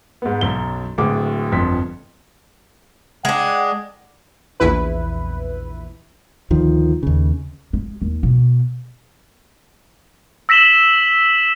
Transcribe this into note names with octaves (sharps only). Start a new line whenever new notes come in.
G#2 B3
B1 F#2 G7
D1 D2 G#3 D6
G1 F2 B6
G#3 D4 F#5 G5
A#1 E2 E4 B4
D2 D#3 F3
D#2 C#3
G#3
D#2
B2
E6 A#6 B6 E7 F#7 G7